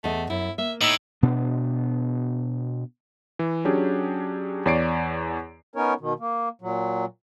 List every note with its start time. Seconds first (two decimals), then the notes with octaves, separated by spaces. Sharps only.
0.04 E2 A3 D#5
0.30 F#2 E4
0.58 A#3 E5
0.81 A2 D#4 E6 F#7
1.22 B2 B3 D4
3.39 E3
3.65 F#3 C#4 D4 G4 G#4
4.66 E2 C#5 D5 C7 D7
5.76 B3 C#4 D#4 A#4 C#5
6.00 B2 D#3
6.19 A#3
6.62 A#2 F#3